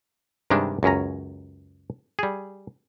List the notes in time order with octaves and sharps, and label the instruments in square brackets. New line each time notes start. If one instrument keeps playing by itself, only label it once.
[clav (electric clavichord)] G2 C3 D#3 G3 G#3 D4
C#2 F#2 C#4 A#5
G3 G#4